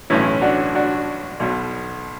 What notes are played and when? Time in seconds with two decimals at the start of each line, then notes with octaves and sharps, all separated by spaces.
0.10 B1 A2 E3 C#4 E4
0.42 D4 F#4
0.75 D4 F#4
1.40 B1 B2